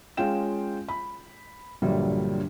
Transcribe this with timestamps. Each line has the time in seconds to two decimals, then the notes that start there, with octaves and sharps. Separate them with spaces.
0.17 G#3 C#4 F4 G5 E7
0.89 B5
1.82 A#1 G2 A#2 D3 F#3 G3